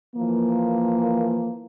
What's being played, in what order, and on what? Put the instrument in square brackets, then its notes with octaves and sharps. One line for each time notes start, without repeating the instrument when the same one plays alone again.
[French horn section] E3 F3 A#3